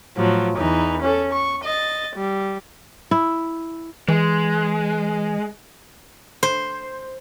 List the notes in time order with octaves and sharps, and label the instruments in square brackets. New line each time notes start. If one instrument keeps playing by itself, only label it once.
[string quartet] A2 F3 F#3
E2 E3 D#4
C#4 A4
C#6
D#5 A6
G3
[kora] E4
[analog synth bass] E3 [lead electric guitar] G#3
[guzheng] C5